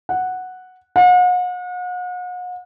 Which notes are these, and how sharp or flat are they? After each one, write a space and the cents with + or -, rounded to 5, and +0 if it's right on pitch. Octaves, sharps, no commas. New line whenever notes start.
F#5 -5
F#5 -40